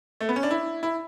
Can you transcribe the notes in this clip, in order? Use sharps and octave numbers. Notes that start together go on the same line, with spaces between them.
A3
B3
C#4
D4
E4
E4